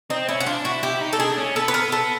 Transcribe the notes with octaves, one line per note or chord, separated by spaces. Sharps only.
C4 D#4
C#4 E4
F#4
D4 F4
E4 F#4
E4 G4
D#4
A4
D4 G#4
C#4
B3 A4
B4
A#4
A4